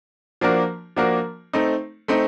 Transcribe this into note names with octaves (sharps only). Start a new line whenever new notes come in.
F3 A#3 D4 F#4 A#4
F3 A#3 D4 F#4 A#4
A3 C4 D#4
A3 C4 D#4